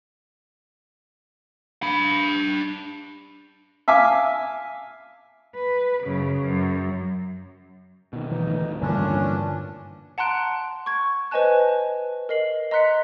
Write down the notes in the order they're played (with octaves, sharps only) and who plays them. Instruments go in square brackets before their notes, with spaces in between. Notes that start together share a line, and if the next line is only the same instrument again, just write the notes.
[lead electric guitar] D4 B5
[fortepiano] E5 F5 G#5 D6
[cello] B4
F#2 C#3
F#2
[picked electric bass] B2 D#3
[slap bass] E3 [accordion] D#4
[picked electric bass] D2 A2 D#3
[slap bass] G2 D3 E3 [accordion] A#2 C#4 D4
[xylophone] F#5 A5 A#5 C6 F#6 D7
C#6 G#6
B4 C5 D#5 G#5 A5 F#6
A#4 D#5 C7 F#7
D#5 A#5 C6 F#6 B6 C#7